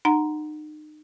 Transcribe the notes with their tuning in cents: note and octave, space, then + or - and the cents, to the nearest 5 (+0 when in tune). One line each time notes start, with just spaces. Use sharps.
D#4 -35 F#5 +0 A#5 +0